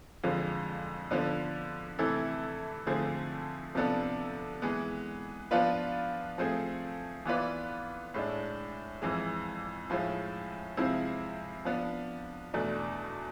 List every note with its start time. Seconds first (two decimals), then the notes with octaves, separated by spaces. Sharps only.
0.24 F2 D3 F3 G#3
1.11 D3 F3 B3 D4
1.99 C3 E3 A3 E4 A4
2.87 D3 F3 A3 C4 G#4
3.75 C3 F3 B3 D4 A4
4.62 E3 G#3 B3
5.51 F3 B3 D4 F4 B4
6.38 F3 A3 C4 G#4
7.25 E3 B3 F4 B4 D5
8.14 A2 G#3 D4
9.02 F2 E3 G#3
9.90 A2 F3 G#3
10.77 C3 F3 G#3 C4 E4
11.65 F3 B3 D4
12.54 E2 B2 A3 D4